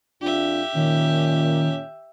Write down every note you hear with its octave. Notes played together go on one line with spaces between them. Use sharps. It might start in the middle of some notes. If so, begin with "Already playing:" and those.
F2 D4 F4 G4 E5
A#2 D#3 C#4